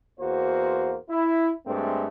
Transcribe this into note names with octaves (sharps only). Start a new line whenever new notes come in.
E2 A#3 F#4 C5
E4
G2 G#3 A3 C4 D4